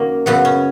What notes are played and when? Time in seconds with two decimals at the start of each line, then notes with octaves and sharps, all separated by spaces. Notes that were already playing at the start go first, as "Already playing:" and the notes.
Already playing: F#2 D#3 F#3 A#3
0.26 F#2 C#3 F#3 B3
0.45 C#4